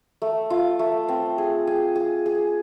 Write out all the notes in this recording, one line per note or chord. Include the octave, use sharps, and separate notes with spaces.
A3
F4
A3
C4
G#4
G#4
G#4
G#4